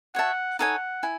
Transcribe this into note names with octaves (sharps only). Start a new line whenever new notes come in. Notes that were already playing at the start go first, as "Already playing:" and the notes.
F#4 C#5 E5 F#5 A5
D#4 A4 C#5 F#5 G#5
E4 G#5